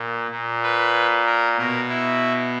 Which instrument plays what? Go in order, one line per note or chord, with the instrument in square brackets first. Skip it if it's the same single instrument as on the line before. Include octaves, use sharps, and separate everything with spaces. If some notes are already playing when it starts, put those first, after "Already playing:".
Already playing: [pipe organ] A#2
A#2
B4
A#4
B2 A#4
E4